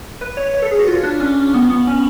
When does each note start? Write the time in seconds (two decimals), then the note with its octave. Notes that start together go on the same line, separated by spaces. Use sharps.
0.21 B4
0.37 C#5
0.54 C#5
0.62 A4
0.71 G#4
0.79 F#4
0.88 F4
1.03 D4
1.20 C#4
1.54 B3
1.70 B3
1.87 C#4